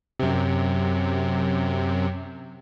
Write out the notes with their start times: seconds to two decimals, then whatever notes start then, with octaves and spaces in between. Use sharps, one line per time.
0.20 F#2 C3